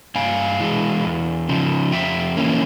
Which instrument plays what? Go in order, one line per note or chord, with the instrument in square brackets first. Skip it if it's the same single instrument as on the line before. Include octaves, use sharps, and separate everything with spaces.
[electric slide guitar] G2 F5 G#5
E3 G#3
E2
C#3 F3
F2 E5 G5
E3 A#3 C#4